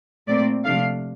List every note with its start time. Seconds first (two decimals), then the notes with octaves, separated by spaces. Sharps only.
0.28 A#2 A3 C4 D5
0.64 C3 F3 A3 D4 F5